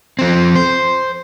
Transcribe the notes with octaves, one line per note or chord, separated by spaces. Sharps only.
F3 C4
C5